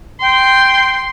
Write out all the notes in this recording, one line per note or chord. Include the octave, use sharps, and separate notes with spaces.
G5 C6